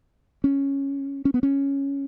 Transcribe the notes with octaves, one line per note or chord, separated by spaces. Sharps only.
C#4
C#4
B3
C#4